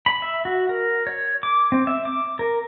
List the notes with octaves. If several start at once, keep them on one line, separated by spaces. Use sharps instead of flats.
B5
E5
F#4
A#4
C#5
D6
C4
E5
D6
A#4